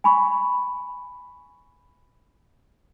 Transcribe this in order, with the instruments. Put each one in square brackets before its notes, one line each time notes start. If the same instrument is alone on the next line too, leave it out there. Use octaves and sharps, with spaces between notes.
[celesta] G#5 B5 C#6